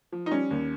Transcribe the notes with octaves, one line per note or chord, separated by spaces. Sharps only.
F3
D#4
G3 C#4
D#2